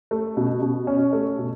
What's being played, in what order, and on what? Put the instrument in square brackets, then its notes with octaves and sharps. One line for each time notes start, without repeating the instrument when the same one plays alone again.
[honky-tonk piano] A3
B2
B2
C#4
A3
B2